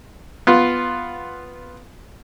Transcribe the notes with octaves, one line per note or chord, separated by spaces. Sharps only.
B3 F4